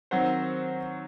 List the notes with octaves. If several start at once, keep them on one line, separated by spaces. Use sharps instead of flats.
D#3 F#3 C4 F#4 C5